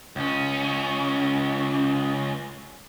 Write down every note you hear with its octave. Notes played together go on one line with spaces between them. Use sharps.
C#2 C#4